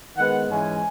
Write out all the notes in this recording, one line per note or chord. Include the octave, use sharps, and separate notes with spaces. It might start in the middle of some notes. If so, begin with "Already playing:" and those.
D#3 G#3 B3 F#5
G#2 E3 G#3 C#4 G#5